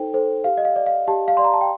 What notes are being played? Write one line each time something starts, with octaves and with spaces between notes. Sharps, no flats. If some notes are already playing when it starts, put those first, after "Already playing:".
Already playing: D#4 A4 C5 G5
A4 C5
G4 F5
D#5
F5
D5
F5
G4 A5
F5
D5 C6
A#5
A5
G5